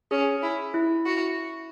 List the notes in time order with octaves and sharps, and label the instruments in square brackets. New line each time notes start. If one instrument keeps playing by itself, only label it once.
[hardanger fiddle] C#4 [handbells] G#4
[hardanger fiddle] E4
[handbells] E4
[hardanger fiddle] F#4